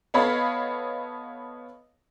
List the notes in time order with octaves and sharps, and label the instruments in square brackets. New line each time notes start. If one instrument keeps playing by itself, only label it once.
[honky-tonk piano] B3 A4 C#5 D#5 F5 B5